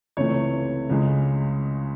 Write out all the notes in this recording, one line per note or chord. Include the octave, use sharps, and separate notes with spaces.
C#2 C3 E3 A3 C#5
C#2 C#3 G#3